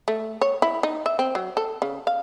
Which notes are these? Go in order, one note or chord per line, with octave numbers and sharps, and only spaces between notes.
A3
C#5
E4
D#4
E5
C4
F#3
A4
C#3
F5